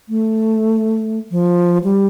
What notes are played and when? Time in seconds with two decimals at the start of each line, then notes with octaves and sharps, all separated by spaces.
0.09 A3
1.31 F3
1.84 G3